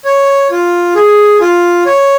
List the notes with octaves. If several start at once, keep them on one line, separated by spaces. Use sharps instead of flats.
C#5
F4
G#4
F4
C#5